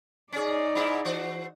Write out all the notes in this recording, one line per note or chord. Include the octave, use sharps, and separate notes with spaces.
C#4 D#4 G#4 D5
G#2 E4
E3 F#4 C5